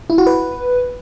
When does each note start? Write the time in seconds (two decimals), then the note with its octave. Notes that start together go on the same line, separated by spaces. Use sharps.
0.10 E4
0.18 F#4
0.27 B4